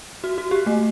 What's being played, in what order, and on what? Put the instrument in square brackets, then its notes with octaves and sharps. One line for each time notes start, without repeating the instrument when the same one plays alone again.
[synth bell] F#4
F#4
G4
A3